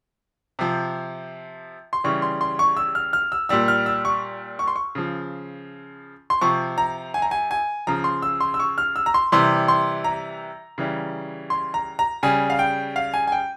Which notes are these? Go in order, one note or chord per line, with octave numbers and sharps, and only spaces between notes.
C3 F3
C6
C#3 E3 G3 C#6
C6
C6
C#6
E6
F6
F6
E6
A#2 G3 E6
F6
E6
C#6
C#6
C6
C#6
C#3 F3
C6
C3 F3 C#6
A#5
G#5
A#5
G#5
G#5
C#3 F3 A#5
C6
E6
C6
E6
C#6
F6
E6
A#5
C6
C3 E3 G3 C6
C6
A#5
C#3 E3 G3
C6
A#5
A#5
C#3 G3 G#5
F5
G5
F5
G#5
G#5
G5